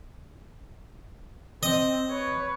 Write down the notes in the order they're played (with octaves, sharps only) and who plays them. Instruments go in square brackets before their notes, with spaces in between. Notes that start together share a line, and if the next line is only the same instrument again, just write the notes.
[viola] C4 [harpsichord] D#5
[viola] B4 C#5